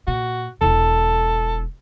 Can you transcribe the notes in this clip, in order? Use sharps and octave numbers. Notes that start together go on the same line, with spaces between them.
A#2 F#4
E1 E4 A4